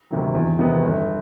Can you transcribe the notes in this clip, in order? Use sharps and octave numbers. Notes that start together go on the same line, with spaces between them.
D2 C3 D#3 F#3
E2
C3 D#3 G#3 B3
G1